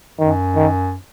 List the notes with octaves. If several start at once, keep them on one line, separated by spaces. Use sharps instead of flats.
F#2 D#3
D#3